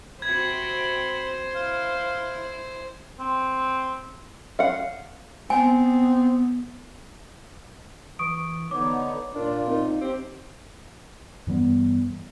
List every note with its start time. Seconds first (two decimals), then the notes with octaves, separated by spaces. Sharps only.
0.22 C3 C4 F#4 C5 B5 G#6
1.55 E4 F5
3.20 C4
4.59 F5 F#5
5.50 B3 C4 G#5
8.19 E3 C#6 D#6 D7
8.71 D3 B3 D#4 C#5 D6
9.34 A#2 D4 F4 A#4
9.68 C4 D#4
10.01 C4 G4 G5
11.47 G2 E3 G3 B3